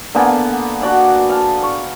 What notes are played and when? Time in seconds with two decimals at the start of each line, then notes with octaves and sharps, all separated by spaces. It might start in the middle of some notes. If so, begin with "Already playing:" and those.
0.15 D3 A#3 B3 G#4
0.82 D4 F#4 D5 F#5
1.29 F5 A5
1.62 C#6